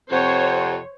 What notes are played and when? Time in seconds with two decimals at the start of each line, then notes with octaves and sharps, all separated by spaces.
0.12 F2 C3 C5 C#5 F#5